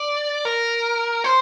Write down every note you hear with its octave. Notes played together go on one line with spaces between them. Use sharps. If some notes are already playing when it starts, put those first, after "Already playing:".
Already playing: D5
A#4
C5